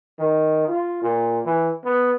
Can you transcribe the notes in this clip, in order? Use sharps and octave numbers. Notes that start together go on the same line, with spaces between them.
D#3
F4
A#2
E3
B3